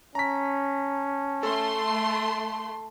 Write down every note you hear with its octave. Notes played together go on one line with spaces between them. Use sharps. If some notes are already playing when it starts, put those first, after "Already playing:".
C#4 A5 A#5 B6
A3 A4 C6